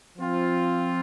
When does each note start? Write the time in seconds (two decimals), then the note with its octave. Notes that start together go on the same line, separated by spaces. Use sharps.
0.18 F3 C4 F4